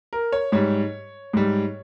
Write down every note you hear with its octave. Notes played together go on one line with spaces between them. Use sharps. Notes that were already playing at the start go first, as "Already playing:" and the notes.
A#4
C#5
G#2 G3 C#5
G#2 G3